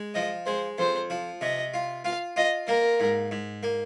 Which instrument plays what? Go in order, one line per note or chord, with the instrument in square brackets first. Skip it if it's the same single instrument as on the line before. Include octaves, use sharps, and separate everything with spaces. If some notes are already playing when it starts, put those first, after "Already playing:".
Already playing: [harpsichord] G#3
[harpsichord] F3 [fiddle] D#5
[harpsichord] G#3 [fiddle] C5
[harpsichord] F2 [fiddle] C5
[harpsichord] F3
[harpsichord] C3 [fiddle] D#5
[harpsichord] F4
[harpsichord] F4 [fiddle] F5
[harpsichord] F4 [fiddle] D#5
[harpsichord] A#3 [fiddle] A#4
[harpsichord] G#2
G#2
A#3